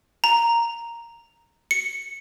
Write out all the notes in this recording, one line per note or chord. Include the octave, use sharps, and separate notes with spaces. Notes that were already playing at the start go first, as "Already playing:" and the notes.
A#5
C#7